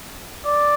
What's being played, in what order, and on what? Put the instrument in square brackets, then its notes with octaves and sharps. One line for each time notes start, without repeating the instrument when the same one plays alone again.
[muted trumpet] D5